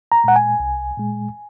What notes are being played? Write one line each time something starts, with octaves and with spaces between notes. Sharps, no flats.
A#5
A#2 G#3 F#5
G#5
C2
A#2 G#3